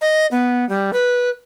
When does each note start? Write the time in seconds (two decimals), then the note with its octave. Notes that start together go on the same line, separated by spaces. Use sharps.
0.01 D#5
0.31 B3
0.69 G3
0.93 B4